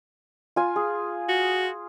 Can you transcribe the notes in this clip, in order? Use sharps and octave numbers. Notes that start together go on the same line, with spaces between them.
F4 G#5
G#4
F#4